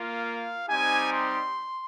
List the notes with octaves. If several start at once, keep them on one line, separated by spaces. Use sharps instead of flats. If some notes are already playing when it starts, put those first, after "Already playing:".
Already playing: A#3 F4
F5
G3 C4 D#4 G4 G#5
C6